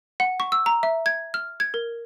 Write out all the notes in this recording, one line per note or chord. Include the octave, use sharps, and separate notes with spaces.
F#5
C#6
E6
A#5
E5
G#6
F6
G#6
A#4